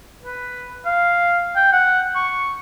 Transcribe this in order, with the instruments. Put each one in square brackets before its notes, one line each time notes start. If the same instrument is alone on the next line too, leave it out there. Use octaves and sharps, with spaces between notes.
[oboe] B4
F5
G5
F#5
C#6